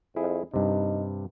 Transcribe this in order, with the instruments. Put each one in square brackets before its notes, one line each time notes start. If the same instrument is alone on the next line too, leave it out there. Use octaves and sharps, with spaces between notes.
[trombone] F2 [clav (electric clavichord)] E4 G#4
[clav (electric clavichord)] G2 C3 [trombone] D#4